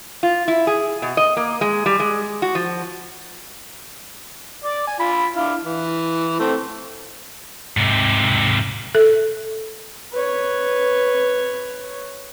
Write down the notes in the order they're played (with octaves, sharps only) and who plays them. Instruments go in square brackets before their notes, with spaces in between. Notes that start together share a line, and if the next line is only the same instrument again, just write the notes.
[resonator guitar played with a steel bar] F4
E4
G#4
B2
D#5
A#3
G#3
G3
G#3
F#4
F3
[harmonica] D5
G#5
F4 B5
D4 E4 F5
E3
A3 C4
[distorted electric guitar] G#2 C3
[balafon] A4
[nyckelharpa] B4 C#5